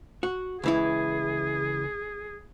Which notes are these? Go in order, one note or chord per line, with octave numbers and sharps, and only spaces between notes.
F#4
C#2 E3 E4 G#4